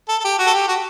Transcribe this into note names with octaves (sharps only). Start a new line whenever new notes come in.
A4
A4
G4
F#4
A4
G4
F#4